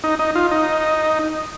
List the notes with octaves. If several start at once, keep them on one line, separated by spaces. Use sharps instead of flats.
D#4
D#4
F4
D#4